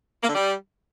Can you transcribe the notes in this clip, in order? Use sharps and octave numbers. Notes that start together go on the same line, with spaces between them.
A#3
D3
G3